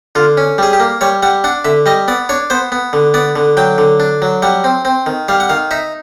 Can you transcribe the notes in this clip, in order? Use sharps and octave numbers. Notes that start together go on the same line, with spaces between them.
D3 F4
C#4
G3 G#4
G4
A#3
G3 C#5
G3 F#5
D4 F#5
D3 E5
G3 D#5
B3 D5
D4 C#5
B3 C5
B3
D3
B3 D5
D3
F#3 G5
D3
D4
F#3
G3 F#5
C4
C4
D#3
G3 F5
F#5
D#3 F5
D#4 E5